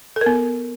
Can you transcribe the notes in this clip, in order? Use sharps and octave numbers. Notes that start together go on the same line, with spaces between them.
A4
A#4
B3